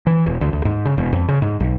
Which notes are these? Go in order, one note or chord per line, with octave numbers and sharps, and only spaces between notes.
E3
E1
D2
D2
G#2
C#3
E1
F2
C#3
G#2
B1